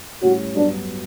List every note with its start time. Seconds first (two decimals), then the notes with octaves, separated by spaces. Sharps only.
0.22 A2 G3 C#4 F#4
0.56 G2 F#3 B3 D4 F#4